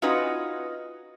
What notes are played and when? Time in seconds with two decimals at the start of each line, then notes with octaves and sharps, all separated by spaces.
0.02 C#4 D#4 F4 F#4 B4 D#5